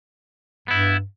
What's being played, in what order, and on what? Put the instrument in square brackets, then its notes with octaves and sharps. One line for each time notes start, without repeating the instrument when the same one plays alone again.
[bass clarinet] G2 [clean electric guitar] B3 E4